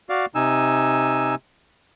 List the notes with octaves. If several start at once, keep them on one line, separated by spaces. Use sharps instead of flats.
F#4 D5 F5
C3 D#4 G#5 E6